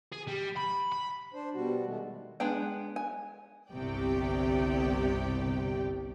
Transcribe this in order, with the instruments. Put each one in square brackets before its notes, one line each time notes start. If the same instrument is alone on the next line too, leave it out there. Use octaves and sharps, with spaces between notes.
[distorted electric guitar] G#4
G3
B5
B5
[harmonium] D4 C5
B2 G3 F#4
D#3 G#3 A3
[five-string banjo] G#3 B3 D4 G5
G#5
[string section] G1 C2 C3 G4 D5 G5